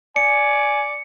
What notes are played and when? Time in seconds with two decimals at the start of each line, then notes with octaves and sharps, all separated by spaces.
0.16 D5 G#5 C#7